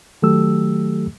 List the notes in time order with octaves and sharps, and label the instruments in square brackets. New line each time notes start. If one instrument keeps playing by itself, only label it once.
[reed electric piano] D#3 F#3 A3 G4 A4 E6